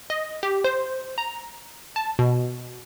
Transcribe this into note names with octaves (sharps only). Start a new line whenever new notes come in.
D#5
G4
C5
A#5
A5
B2